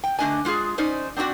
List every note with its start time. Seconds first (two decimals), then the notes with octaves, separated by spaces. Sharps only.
0.04 G5
0.19 D3 A3 D4 D#5 G#5
0.45 G#3 F4 G4 G#4
0.78 C#4 D#4 C5 D5
1.16 C4 D4 D#4 F#4 D5